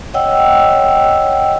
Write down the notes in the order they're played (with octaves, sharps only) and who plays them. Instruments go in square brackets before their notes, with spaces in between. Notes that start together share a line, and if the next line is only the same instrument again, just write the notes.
[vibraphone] C#5 D#5 F#5 G5 E6